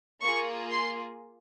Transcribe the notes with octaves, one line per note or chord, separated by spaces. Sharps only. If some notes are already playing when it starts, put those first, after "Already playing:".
A#3 F4 G#4 C#6
C6